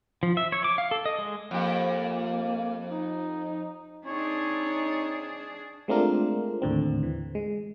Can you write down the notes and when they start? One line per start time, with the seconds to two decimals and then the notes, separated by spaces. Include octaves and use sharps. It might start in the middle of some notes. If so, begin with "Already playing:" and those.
0.23 F3
0.37 E5
0.52 C#5
0.64 D6
0.78 F5
0.91 A4
1.06 D#5
1.19 G#3
1.51 F2 A#3 G4
2.90 D#4
4.07 C4 D4 D#4 G#4 C#5
5.88 G#3 A3 C4 D4 F4 A#4
6.62 D#2 A2 D3 C4
7.03 E3
7.35 G#3